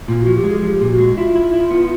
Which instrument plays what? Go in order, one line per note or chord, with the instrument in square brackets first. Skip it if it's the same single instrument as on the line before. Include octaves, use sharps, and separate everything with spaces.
[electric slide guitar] A#2 [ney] F4
[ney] F#4
[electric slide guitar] F3
[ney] G4
[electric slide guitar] G#3
[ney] G#4
[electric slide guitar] F3 [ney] G4
[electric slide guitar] A#2
[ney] F#4
[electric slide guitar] G#3
[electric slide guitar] E4 [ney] F4
[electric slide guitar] E4
E4
B3